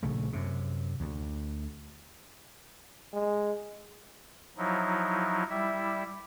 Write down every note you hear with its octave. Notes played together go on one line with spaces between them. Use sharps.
A#1 C#3 A3
F#2 C3
D2
G#3
F3 F#3 D#4 E4
G3 E4 E5